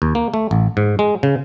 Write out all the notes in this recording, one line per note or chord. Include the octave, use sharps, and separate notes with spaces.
D#2
A#3
A3
A1
G#2
G#3
C#3